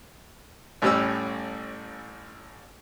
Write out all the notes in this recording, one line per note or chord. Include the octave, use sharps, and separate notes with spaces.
A1 A2 G3 C#4 E6